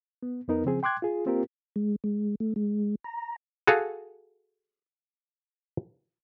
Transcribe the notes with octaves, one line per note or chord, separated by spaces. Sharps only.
B3
F2 B3 D#4 A#4
C#3 F3 C4 G#4
G5 C6 D6 F#6 G#6
F4 G#4
A#3 C4 F4 G4 A#4
G#3
G#3
A3
G#3
A#5
F#4 G#4 A4 F5